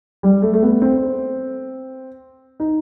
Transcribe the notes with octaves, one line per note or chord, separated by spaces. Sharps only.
G3
A3
A3
B3
C4
D#4